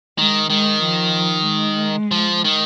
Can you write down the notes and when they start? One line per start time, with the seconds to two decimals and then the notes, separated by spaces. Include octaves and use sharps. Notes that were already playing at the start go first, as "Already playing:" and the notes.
0.18 D#3 G#3
0.50 D#3 G#3
0.83 F3
1.47 G#3
2.11 F3
2.45 D#3